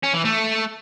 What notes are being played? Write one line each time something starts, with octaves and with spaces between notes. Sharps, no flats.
C#4
E3
A3